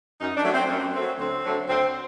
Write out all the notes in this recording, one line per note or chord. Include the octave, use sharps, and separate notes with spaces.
F#2 D#4
D4
F#3 A3
C4
F#2
F#3 A3 C4
D2 C4
D3 F#3 A3
D2 C4